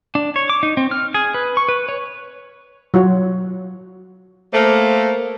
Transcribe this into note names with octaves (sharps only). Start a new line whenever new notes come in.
D4
C#5
D6
D#4
C4
F6
G#4
B4
C#6
B4
C#5
F#3 F4 F#4 C#5
A3 A#3 C5